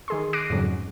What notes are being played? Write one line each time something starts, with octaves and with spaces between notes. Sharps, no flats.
D#3 G#4 C6
D6 F#6 A#6 C7 D7 D#7
F2 G#2 C#3 F#3